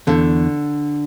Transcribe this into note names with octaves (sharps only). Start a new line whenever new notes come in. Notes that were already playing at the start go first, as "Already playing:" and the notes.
E2 D3